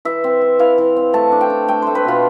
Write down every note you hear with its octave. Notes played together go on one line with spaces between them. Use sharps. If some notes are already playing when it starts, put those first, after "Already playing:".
E3 E5
C4
C4
E3 F5
E3
C4
A3 A5
D4
G5
D4
A3 G5
A3 C5
B4
B2 F4